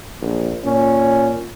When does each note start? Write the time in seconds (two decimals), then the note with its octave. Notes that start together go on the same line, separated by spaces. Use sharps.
0.21 A#1
0.65 A#2 C#4